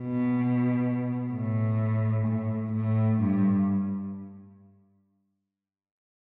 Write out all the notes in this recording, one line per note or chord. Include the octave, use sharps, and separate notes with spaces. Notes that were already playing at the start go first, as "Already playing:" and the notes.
Already playing: B2
A2
A2
A2
G2